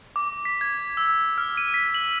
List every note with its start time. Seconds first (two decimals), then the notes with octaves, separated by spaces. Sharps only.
0.16 D6
0.45 B6
0.61 G#6
0.97 E6
1.38 F6
1.57 D#7
1.74 B6
1.94 F#7